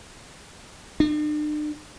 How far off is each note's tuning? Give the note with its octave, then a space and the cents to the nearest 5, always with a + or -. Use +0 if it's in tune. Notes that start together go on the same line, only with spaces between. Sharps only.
D4 +45